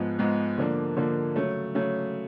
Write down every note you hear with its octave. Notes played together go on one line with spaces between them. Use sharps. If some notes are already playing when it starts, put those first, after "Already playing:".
Already playing: G#2 F3 G#3 B3
G#2 F3 G#3 B3
D3 F3 A#3 D4
D3 F3 A#3 D4
C#3 F#3 A3
C#3 F#3 A3